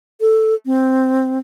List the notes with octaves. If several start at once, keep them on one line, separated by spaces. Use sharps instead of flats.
A4
C4